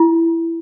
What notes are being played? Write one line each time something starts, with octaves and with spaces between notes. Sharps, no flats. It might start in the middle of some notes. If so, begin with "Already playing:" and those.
Already playing: E4